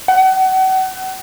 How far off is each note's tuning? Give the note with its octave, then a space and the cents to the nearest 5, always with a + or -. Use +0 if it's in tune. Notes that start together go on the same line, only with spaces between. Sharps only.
F#5 +35